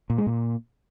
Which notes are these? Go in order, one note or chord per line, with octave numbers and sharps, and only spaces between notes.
A#2
G#3
A#2